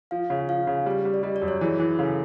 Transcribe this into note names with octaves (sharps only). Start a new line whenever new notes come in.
F3 F5
C#3
F3 F5
C#3
G3
G3
D5
G3 D#5
D5
F#2
C#5
E3 G#4
E3
C#3 A4